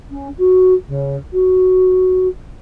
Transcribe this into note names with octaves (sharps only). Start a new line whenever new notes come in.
C#4
F#4
C#3
F#4